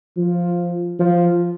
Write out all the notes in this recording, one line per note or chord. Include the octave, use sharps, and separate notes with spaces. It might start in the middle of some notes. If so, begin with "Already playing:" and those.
F3
F3